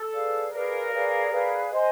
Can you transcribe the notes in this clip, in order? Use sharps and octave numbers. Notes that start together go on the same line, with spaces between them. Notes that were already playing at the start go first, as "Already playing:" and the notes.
Already playing: A4
G#4 B4 D5 F5
G#4 A#4 B4 D5 F5
G#4 B4 D5 F5
G#4 B4 D5 F5
C5 D#5 G#5 C6